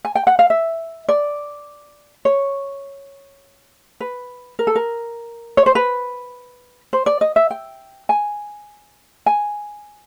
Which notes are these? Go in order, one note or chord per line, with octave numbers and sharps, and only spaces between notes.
G#5
G5
F#5
F5
E5
D5
C#5
B4
A#4
A4
A#4
C#5
C5
B4
C5
D5
D#5
E5
G5
G#5
G#5